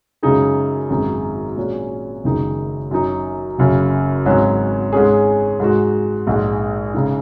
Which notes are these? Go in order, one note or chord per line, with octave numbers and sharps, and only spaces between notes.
F#2 C#3 G#3 D#4 G#4
G#1 F#2 D#3 G#3 D#4
A#2 G#3 C#4 F#4
F#1 F#2 D#3 G#3 D#4
F#2 F#3 D#4
F#1 F#2 C#3 F#3
G#1 G#2 F#3 C#4
G#2 G#3 C#4 G#4
G#2 G#3 F#4
A#1 G#2 G#3
C#3 G#3 D#4